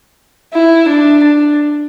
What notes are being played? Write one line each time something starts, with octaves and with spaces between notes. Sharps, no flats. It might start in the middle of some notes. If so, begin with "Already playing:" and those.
E4
D4
D4